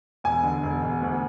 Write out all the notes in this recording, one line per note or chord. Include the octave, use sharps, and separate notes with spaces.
E1 G#5
D3
E1
E1
D2